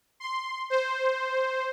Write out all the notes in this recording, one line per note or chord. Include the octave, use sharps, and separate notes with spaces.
C6
C5